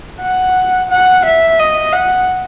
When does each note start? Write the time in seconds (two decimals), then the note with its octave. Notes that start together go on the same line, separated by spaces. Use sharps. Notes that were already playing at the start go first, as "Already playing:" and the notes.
0.21 F#5
0.90 F#5
1.25 E5
1.59 D#5
1.93 F#5